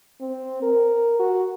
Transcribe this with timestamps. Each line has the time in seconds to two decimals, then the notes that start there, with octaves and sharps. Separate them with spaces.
0.21 C4
0.62 A#4
1.19 F#4